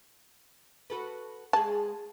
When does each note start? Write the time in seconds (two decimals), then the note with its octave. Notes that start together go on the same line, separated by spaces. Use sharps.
0.90 F#4 A4 B4
1.53 G#3 G#4 A5